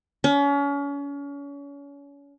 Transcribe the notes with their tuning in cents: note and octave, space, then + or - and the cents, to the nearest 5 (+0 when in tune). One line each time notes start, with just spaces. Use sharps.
C#4 +35